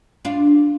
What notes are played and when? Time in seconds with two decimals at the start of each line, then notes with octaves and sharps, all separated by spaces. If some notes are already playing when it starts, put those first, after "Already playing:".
0.25 D4 F4